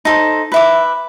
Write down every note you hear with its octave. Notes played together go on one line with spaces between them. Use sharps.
D#4 A4 C5
B4 E5 D6